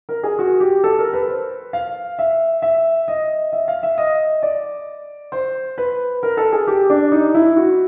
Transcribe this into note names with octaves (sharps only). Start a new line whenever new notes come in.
A#4
G#4
F#4
G4
A4
A#4
B4
C5
F5
E5
E5
D#5
E5
F5
E5
D#5
D5
C5
B4
A#4
A4
G#4
G4
D4
D#4
E4
F#4